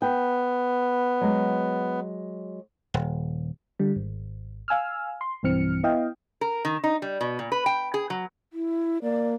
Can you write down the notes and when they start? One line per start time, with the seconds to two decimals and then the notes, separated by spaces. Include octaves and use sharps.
0.02 B3 G5
1.21 F#3 G#3
2.94 D#1
3.79 D3 G3
3.96 G#1
4.68 F5 G#5 E6 F6
5.21 C6
5.43 B1 G2 E3 C4 F6 C#7
5.83 B3 E4 D#5 F5 G5
6.41 A#4
6.65 D#3
6.84 D#4
7.02 G3
7.21 B2
7.39 A#2
7.52 B4
7.66 G5
7.94 G#4
8.10 F#3
8.53 E4
9.02 A#3 D5